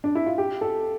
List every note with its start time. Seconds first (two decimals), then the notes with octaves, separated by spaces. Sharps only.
0.04 D4
0.15 E4
0.26 F4
0.38 G4
0.61 A4